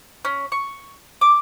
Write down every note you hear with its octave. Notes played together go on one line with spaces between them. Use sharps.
C#4
C#6
D6